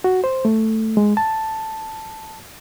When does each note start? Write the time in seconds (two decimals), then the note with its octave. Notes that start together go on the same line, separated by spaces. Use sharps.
0.04 F#4
0.24 C5
0.45 A3
0.97 G#3
1.17 A5